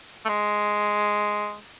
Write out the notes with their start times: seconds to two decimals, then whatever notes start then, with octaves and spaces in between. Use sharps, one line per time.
0.25 A3
0.29 G#3